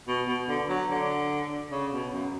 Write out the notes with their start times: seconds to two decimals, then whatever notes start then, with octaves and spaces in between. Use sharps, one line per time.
0.08 B2
0.28 B2
0.49 D3
0.69 F#3
0.90 D3
1.72 C#3
1.93 B2
2.12 F#2